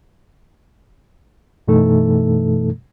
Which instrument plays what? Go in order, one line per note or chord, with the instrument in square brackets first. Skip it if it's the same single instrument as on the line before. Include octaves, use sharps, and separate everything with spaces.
[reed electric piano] F#2 B2 E3 A3 D#4 A4